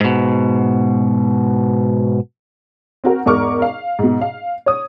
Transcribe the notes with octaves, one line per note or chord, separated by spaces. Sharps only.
G#2 B2
C4 F#4 A#4
E2 G#2 A#4 C#6 D6 F6
F5
G#2 B2
F5
C#5 D#6